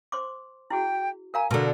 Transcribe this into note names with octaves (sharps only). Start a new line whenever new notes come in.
C5 C6 D6
E4 F#4 G#4 G5
A#4 F5 G#5 A#5
B2 D3 A#4 B4 A5